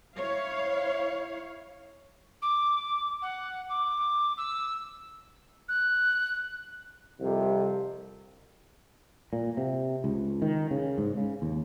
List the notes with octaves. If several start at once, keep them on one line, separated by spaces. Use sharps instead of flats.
E4 C#5 F5
D6
F#5
D6
E6
F#6
C2 F2 C3
A#2
C3
C#2
D#3
C#3
G#2
C#3
D#2